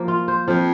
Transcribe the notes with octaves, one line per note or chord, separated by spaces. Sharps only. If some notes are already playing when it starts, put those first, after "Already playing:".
Already playing: F3 A#3
F4
C5
F2 F3